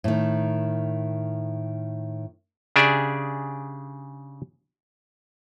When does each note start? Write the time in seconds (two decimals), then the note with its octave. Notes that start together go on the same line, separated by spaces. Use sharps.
0.04 A2 D#3
2.76 C#3 D4 G4 G#4 D5 E5